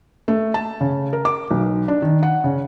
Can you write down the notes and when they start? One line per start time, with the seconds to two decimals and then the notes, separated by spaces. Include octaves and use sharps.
0.28 A3
0.54 A5
0.81 C#3
1.13 A#4
1.25 D6
1.51 B1
1.88 D4
2.02 D#3
2.23 F#5
2.44 C#3